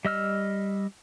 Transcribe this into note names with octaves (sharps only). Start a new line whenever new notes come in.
G3 D#5 E6 F6